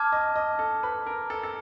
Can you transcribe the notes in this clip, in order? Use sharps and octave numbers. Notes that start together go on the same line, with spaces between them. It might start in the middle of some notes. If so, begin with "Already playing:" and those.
Already playing: A5 D6 F6 G#6
D#5
D#5
A4
B4
A#4
A4
A4